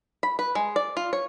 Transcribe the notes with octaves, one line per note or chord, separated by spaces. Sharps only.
B5
B4
G#3
D5
F4
C#5